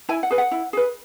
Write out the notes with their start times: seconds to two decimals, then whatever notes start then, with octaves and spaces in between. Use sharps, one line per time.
0.09 E4 G#5
0.23 F#5
0.31 G#4 B4
0.38 F#5
0.51 E4
0.73 G#4 B4